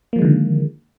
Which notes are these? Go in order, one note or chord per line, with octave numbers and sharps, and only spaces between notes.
D3 D#3 F3 G#3 A#3